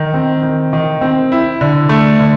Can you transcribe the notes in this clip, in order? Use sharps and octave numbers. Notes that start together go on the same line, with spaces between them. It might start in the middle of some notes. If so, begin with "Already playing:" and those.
Already playing: D#3
C4
D#3
D#3
C4
E4
D3
A3
D3